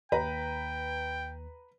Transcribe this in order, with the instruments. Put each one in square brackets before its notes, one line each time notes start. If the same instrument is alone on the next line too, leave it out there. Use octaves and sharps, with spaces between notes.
[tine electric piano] D#2 [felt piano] B4 A#5 B5 [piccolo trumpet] G5